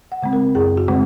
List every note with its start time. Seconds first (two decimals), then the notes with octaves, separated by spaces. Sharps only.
0.12 F#5
0.23 C#3 G#3 C4
0.33 A#4
0.55 F#2 G#4
0.77 F#4
0.88 C#3 G#3 C4